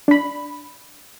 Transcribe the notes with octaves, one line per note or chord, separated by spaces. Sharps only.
D4 B5